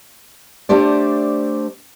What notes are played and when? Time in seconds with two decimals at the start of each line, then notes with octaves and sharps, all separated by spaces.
0.69 A3 D4 G4 C5 D5